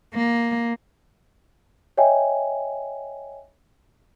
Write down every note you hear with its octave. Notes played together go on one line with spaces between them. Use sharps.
A#3
C#5 D#5 E5 G5 G#5